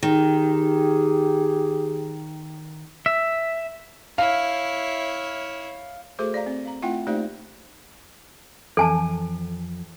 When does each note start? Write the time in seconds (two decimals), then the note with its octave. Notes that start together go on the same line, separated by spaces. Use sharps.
0.03 D#3 G4 G#4
3.06 E5
4.18 E4 C#5 F5
6.19 A3 F#4 G#4 A4 C5 D6
6.34 D5 F5 A#5
6.46 C4
6.65 F5 A#5
6.82 A3 C4 E4 F4 F#5 G5
7.07 A3 A#3 D#4 G4 C5 D5
8.77 F2 E3 A4 G#5 A5